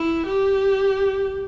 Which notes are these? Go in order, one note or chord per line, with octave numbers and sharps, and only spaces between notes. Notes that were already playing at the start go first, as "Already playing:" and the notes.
Already playing: E4
G4